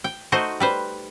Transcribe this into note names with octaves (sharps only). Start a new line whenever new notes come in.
G5
A3 D#4 F#4 C5 D#5
G3 B4 C5